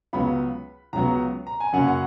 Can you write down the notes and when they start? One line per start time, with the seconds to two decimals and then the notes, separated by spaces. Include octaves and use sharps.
0.13 C#2 C#3 F#3 B3 B5
0.93 C#2 C#3 F#3 B3 A#5
1.47 A#5
1.60 G#5
1.73 F#2 C#3 F#3 A#3 C#4 F#5
1.88 F#5